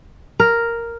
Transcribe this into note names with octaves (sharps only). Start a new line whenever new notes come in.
A#4